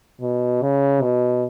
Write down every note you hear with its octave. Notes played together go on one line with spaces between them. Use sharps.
B2
C#3
B2